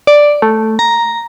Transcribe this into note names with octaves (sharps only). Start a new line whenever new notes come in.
D5
A3
A#5